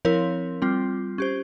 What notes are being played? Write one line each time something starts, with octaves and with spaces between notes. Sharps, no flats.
F3 C4 E4 A#4 C#5
G3 C4 F4
C#4 G4 C5